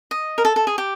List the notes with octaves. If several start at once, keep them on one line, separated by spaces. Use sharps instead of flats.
D#5
A#4
A4
A4
G#4
G4